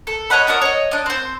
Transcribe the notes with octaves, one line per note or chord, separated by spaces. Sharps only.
A4
C#5 D#5 F#5 B5
D4 F#4 A#4 D#6
C#5 D#5
D4 D#5
C4 C5